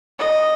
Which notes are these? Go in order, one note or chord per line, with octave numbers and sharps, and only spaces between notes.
D#5